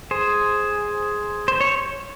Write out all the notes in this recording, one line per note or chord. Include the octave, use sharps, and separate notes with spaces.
G#4 C5
C5
C#5